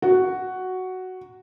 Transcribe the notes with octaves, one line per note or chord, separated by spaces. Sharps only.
F#4